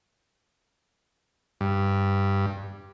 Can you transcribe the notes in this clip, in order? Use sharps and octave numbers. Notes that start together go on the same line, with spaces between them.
G2